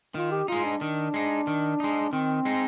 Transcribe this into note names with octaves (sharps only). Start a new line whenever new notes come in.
D#3 F4
G4
G#3 D#4 F4
D4
D#3
G#3 D#4
D#3
G#3 D#4
D#3 C4
G#3 D#4